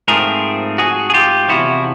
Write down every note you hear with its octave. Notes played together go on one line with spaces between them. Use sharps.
G#2 F3 A3 C4 G#4 A#4
F#4 G#4
G#4
F4 G4
E2 C3 F3 E4 F#4